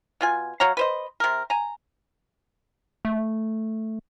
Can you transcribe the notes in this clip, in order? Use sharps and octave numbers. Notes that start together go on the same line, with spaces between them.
B2 F4 G#5
F#3 C#5 F5 A#5
B4 C5 D#5
C3 A#4
G#5 A#5
A3